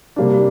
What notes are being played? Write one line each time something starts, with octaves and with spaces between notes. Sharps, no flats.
C3 G3 A#3 D4